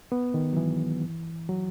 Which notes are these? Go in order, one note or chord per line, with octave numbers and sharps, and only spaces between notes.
B3
D#3
F#3
E3
F#3